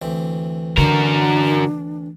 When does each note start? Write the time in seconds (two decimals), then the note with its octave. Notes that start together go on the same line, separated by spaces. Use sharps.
0.02 D2 E3 C4
0.78 D3 D4 F#4 A#4